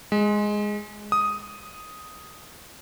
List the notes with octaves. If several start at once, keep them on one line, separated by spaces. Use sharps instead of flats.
G#3
D#6